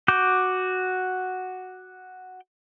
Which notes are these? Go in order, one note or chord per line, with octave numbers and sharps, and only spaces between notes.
F#4 D6 G6